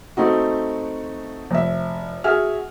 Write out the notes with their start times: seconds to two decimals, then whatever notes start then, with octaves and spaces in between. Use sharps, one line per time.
0.17 A3 C4 D#4 F#4
1.51 F1 E5
2.24 F#4 G#4 E5 G#5 F6